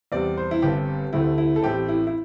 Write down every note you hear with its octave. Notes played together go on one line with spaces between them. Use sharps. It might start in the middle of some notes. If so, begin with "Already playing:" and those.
E2 C3 G3 C4 D5
C5
E4
G1 G2 G3 C4 G4
D2 C3 A3 C4 E4
E4
A4
A1 A2 A3 C4 G4
E4
E4